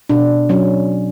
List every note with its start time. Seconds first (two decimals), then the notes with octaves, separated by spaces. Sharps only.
0.10 B2 D4
0.49 F#3 C#4